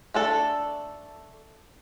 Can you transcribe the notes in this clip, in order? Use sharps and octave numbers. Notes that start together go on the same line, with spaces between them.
A3 D4 A4